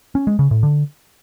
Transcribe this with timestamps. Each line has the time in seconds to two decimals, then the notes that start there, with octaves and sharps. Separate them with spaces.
0.15 C#4
0.27 G#3
0.39 C#3
0.51 A2
0.63 D3